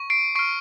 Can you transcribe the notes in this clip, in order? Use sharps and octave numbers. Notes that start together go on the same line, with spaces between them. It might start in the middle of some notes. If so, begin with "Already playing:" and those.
Already playing: C#6
C7 D7
C#6 F6 C7 D7